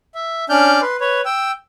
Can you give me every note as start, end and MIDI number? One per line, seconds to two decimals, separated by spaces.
0.15 0.45 76
0.50 0.81 61
0.50 0.81 62
0.50 0.81 74
0.50 0.81 89
0.50 0.81 91
0.82 0.97 71
0.82 0.97 84
1.01 1.21 71
1.01 1.21 73
1.25 1.51 79
1.25 1.51 88